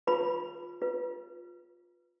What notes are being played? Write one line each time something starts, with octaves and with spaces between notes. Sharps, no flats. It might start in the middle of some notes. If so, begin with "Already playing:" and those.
F4 B4 B5
F4 B4